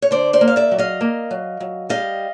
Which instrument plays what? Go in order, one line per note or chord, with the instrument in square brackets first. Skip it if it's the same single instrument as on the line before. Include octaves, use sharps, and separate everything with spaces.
[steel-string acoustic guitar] C#5
D3 C5 D5
C5 D5
A#3
F5
D5 E5
F#3
D#5 F5
A#3
F#3
F#3
G3 D#5 F5